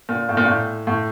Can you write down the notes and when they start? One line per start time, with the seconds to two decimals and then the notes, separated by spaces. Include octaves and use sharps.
0.09 A#2
0.29 A2
0.37 A#2
0.46 A2
0.87 A2